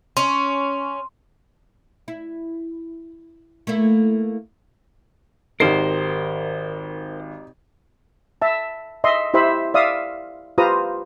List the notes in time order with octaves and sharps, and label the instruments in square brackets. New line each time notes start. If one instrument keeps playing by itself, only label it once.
[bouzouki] C#4 [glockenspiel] C6
[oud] E4
A3 A#3 E4
[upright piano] G#1 C7 [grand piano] D#4 G4 [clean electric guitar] A#4 C5
[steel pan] E5 A5
D#5 E5 C6
E4 G4 C5 E5 B5 E6
D5 E5 F5 D#6
F4 G4 B4 C5 A#5 D#6